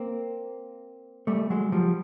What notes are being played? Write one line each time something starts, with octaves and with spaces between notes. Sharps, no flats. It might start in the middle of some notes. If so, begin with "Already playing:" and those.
Already playing: A#3 C4
G3 A3
F#3 G#3
F3 G3